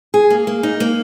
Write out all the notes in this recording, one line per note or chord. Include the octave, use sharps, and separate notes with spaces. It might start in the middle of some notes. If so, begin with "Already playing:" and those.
G#4
A#3
A#3
D#4
A#3